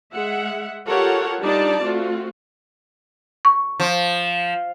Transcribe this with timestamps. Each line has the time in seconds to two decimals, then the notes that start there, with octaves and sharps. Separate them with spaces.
0.13 G#3 E5 F#5
0.87 F4 G4 A4 A#4 C#5 F#5
1.41 G3 D4 D#4 F4 D5 A5
1.82 A3 C4 F4 F#4
3.45 C#6
3.80 F3